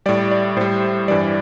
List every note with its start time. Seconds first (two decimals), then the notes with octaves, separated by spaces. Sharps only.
0.06 A2 G3 D5
0.31 D5
0.56 A2 G3 C5
1.08 G2 E3 G3 D5